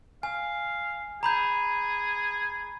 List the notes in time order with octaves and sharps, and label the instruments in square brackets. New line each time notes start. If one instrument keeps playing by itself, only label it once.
[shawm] F5 [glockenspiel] G#5
[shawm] G#4 [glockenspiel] A#5 B5 G6